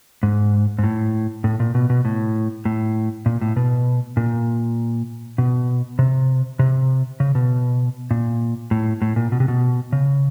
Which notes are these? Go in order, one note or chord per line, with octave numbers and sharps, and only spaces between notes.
G#2
G#2
A2
A2
A#2
B2
B2
A2
A2
A#2
A2
B2
A#2
B2
C3
C3
C#3
B2
A#2
A2
A2
A#2
B2
C3
B2
C#3